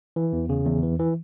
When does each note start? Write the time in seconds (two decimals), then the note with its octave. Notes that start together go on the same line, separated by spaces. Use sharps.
0.16 E3
0.33 E2
0.49 C#3
0.66 E2
0.83 E3
0.99 E3